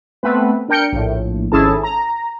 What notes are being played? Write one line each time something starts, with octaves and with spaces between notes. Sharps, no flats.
A3 B3 C4 B4
D4 A#4 G5 G6 C#7
A#1 A2
G#1 C#4 E4 G#4 A4 A5
A#5